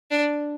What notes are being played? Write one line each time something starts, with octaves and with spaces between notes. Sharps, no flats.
D4